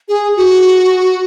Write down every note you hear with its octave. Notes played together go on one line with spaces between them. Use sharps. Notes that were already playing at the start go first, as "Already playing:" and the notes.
G#4
F#4